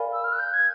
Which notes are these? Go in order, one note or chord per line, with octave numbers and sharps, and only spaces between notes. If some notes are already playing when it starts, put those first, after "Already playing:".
Already playing: A#4 D5 F5 G#5 B5
E6
F6
F#6
G6
G#6